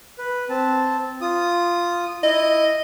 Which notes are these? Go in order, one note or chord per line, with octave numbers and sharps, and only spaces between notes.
B4
C4 A5
F4 D#6
E4 D#5